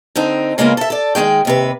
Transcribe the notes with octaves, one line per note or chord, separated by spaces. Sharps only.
D3 C4 D#4
C#3 G#3 A#3 B3 F4 A#4
A4 E5
A4 D5
D#3 G#3 A3 G#4 G5
D#2 C3 B4